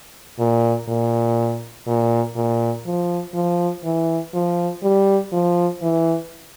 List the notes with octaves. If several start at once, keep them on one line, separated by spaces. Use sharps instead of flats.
A#2
A#2
A#2
A#2
F3
F3
E3
F3
G3
F3
E3